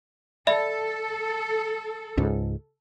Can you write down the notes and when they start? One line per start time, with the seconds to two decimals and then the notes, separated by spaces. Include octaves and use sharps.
0.47 A4 D5 E5 B5
2.17 C#2 G#2